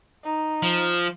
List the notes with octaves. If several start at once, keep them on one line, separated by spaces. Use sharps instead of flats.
D#4
F3